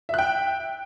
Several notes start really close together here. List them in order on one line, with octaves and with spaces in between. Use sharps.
E5 F#6 G5